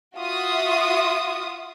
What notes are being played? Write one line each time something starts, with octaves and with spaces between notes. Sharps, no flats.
F4 F#4 E5 D#6